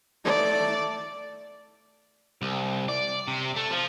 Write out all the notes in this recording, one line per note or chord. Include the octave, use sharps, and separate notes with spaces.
A3 D5
C2
D5
C3
A3
F3